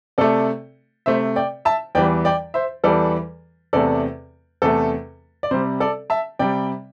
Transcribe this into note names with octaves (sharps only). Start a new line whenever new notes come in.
C3 A3 A4 D5
C3 A3 C5 E5
D5 G5
E5 A5
E2 E3 G3 D5 G5
D5 G5
C5 E5
E2 E3 G3 A4 D5
E2 C3 A3 A4 D5
E2 C3 A3 A4
D5
C3 G3 C5
A4 D5
E5 A5
C3 G3 D5 G5